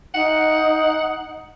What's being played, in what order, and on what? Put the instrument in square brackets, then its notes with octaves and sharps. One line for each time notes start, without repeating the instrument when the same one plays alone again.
[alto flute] D#4 [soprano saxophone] F#5